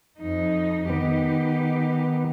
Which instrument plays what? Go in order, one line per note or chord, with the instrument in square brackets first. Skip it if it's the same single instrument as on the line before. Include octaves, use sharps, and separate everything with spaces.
[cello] F2 D#4
[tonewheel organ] D#3 B3 [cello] D#4 G4